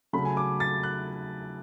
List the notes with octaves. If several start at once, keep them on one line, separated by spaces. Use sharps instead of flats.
C#3 F#3 A3 B5
G#5
D6
A6
F#6